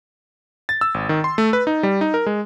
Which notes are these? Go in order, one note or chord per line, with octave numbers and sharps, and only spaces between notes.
A6
E6
G#1
D#3
C6
A3
B4
D#4
G3
D#4
A#4
G#3